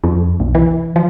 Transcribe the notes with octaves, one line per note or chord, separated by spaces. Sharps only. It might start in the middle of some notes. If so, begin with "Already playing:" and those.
F2
B1
E3
F3